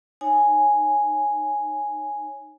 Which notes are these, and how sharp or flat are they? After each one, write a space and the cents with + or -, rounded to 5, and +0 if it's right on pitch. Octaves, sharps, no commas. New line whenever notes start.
D#4 -20 C#5 +0 G#5 +0